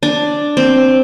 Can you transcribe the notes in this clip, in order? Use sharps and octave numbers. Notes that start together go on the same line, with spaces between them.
D4
C4